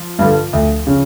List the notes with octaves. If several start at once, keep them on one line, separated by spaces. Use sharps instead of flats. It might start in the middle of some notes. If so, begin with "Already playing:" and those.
Already playing: F3
G2 D3
D2
C#3